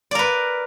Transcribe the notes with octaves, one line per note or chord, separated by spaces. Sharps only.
A#4 B4 D5